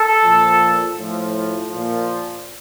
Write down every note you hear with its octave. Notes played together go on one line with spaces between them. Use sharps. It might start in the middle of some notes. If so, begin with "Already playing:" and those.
Already playing: A4
A#2 F3
A2 F3
A#2 F3